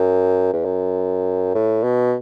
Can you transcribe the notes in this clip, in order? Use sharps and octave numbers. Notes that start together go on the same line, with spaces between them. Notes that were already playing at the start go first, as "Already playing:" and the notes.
Already playing: F#2
E2
F#2
A2
B2